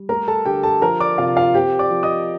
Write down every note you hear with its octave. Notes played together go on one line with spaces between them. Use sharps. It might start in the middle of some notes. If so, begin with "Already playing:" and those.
Already playing: G3
A3 A#4 A#5
A4 A5
D3 G4 G5
A4 A5
F3 A#4 A#5
D5 D6
C3 F4 F5
F4 F5
C4 G4 G5
D5 D6
F3
D#5 D#6